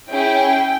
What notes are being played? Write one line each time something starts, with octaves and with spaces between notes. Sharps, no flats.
C#4 E4 G#4 G5